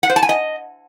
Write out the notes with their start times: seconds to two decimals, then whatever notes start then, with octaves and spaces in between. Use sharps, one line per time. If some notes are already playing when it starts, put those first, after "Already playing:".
0.03 F#5
0.10 C5
0.16 A5
0.23 G#5
0.29 D#5